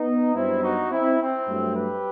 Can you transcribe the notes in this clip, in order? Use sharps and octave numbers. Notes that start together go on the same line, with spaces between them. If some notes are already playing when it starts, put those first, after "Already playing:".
Already playing: B3 D#4
G2 F#3 B3 C4 E4
D#4 F#4
C4 E4
C4
G2 F#3 A3
G4 B4